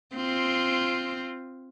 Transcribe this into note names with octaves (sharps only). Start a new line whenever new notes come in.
C4 F4